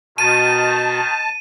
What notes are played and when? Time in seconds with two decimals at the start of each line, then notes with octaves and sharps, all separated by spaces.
0.18 B2 D#3 A5 D#7